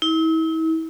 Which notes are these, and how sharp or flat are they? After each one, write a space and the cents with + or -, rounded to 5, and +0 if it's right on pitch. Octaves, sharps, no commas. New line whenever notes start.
E4 -40